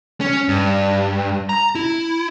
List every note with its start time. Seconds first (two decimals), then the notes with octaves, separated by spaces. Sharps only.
0.21 C#4
0.48 G2
1.49 A#5
1.75 E4